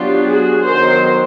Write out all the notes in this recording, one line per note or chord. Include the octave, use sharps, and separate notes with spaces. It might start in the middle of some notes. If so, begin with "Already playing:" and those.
Already playing: F#3 B3 D4 F4 G4
F#4 G#4
D#3 F#3 B3 A#4 C5